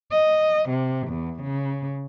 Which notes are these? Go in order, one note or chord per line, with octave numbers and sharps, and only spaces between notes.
D#5
C3
E2
C#3